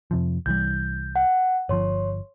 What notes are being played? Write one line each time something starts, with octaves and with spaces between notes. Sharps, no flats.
F2 C3 F3
C2 E3 G3 G6
F#5
G1 F3 C#5 C6